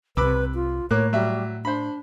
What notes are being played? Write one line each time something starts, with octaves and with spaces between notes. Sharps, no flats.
C2 C3 B4 B5 D6 E6
F4
A2 A#3 C#5 D6 F#6
F#3 G3 E5
D4 C5 B5